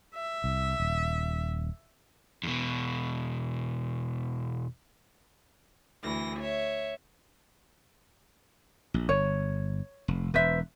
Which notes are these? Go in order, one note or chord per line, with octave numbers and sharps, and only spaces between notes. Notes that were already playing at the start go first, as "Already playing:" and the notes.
E5
C2
D#1
E2 B2
D2 E3 A#6
C#5 E5
A#1
G1 C#5
F1
E1 B4 C5 E5